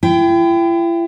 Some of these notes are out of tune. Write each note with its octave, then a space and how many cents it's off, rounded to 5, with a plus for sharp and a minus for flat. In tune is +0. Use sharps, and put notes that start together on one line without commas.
E4 +40 G5 +0